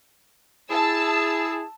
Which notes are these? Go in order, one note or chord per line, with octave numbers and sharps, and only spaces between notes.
E4 G#4 A5 E6